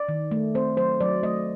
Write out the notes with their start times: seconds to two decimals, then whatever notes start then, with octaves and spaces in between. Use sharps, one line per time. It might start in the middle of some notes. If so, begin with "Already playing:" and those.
Already playing: D5
0.09 D#3
0.31 A3
0.55 C4 C5
0.77 F#3 C5
1.00 F#3 D5
1.23 A3 D#5